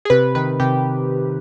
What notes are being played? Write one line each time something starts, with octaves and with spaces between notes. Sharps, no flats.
G#4
C3 B4
D#3 B4
C3 G4